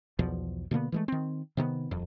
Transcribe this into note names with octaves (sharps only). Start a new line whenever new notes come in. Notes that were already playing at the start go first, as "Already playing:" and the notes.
B1 E2 B2 F3
B2 D3 A#3 B3
E3 G#3 A3
D#3 C4
C3 D#3 A#3 B3
D#1 F2